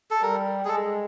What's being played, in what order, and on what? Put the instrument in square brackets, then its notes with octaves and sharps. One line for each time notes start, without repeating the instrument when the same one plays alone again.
[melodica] A4
[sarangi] G3 [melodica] A#4
[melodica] G#4
[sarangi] G#3 [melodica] A4